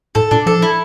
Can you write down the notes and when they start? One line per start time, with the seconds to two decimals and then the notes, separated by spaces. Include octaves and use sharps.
0.15 A2 A4
0.31 A#2 D4
0.46 F3 A4
0.62 E4